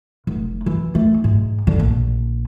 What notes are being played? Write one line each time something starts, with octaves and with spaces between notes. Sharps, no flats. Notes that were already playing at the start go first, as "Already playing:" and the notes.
F1
E3
A3
G#2
D3
A#1